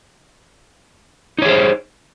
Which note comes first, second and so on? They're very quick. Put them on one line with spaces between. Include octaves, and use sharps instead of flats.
D#4 C#5 G#4 C5